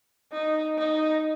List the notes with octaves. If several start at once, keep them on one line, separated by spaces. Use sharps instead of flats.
D#4
D#4